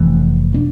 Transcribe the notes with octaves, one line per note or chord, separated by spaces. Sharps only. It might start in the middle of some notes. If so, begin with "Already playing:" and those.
Already playing: F1 F2 E3 A3
B2 B3 D4